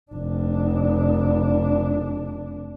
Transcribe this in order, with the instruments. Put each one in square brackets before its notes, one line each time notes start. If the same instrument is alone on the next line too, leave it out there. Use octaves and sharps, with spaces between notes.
[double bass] F1 D4